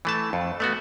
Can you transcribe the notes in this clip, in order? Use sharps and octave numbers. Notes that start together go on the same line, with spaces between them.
E3 A3 A5
F2
A3 B3 F#4